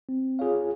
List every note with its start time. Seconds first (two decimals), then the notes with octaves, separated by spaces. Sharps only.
0.09 C4
0.39 F4 G#4 C#5 F5